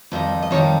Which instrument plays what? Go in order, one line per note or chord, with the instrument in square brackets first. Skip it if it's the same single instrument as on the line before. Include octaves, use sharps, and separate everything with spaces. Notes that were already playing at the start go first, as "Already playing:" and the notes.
[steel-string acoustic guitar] F2 D#3 G3
D#5
F2 D#3 G3 C#5